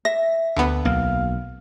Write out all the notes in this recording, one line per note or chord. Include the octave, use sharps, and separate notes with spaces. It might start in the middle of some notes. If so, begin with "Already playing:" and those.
E5 A#6
D2 B3
B1 A#3 F5